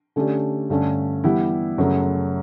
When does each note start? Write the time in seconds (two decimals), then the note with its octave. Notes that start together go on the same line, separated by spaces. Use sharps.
0.16 D3 A3 C#4 G4 D5
0.70 G2 D3 A3 C#4
1.24 E3 G3 B3 E4 G4
1.78 F#2 C#3 F#3 A3